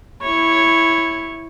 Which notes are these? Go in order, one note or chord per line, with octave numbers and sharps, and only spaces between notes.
E4 C#5